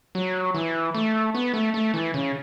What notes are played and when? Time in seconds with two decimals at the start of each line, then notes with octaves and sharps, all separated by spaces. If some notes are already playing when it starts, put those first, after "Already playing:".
0.15 F#3
0.55 E3
0.95 A3
1.35 B3
1.54 A3
1.74 A3
1.94 E3
2.14 C#3